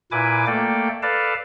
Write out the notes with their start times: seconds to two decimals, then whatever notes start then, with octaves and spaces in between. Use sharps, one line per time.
0.12 A#2 E4 B4 G#5 D6
0.47 A3 A#3 A4 D5 G5
1.03 A4 B4 D5 F5 A5